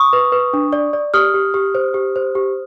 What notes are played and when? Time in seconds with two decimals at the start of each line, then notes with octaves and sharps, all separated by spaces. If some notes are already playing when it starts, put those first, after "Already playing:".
Already playing: C#6 D#6
0.13 B4
0.32 B4
0.53 D4
0.73 D5
0.93 D5
1.14 G4 D#6 F6
1.34 G4
1.54 G4
1.75 C5
1.94 G4
2.16 C5
2.35 G4